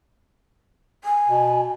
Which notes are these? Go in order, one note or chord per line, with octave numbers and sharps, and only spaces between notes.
G#5
B2